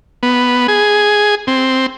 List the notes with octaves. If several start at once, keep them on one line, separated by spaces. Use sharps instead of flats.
B3
G#4
C4